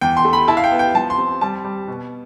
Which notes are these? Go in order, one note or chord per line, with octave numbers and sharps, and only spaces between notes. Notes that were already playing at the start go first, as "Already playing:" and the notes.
E2 G5
C6
A3
B5
E4 A5
F5
G5
B3
G5
F3 A5
C6
C4
G3 A5
G3
B2